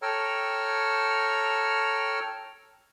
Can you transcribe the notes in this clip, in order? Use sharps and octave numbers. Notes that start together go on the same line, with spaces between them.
A4 C#5 G5 A#5 E6 F6